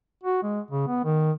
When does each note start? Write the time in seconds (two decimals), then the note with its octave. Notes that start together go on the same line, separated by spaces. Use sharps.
0.24 F#4
0.43 G#3
0.71 C#3
0.87 B3
1.04 D#3